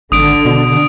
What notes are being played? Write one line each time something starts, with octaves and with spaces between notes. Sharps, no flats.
G#1 D3 D#6 D7
B2